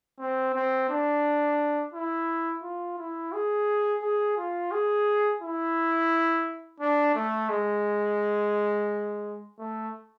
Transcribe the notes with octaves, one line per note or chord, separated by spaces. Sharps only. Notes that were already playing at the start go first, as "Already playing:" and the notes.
C4
C4
D4
E4
F4
E4
G#4
G#4
F4
G#4
E4
D4
A3
G#3
A3